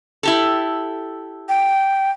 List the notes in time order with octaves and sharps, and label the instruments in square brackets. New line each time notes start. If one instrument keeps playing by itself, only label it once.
[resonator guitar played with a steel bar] E4 G4 A4
[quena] G5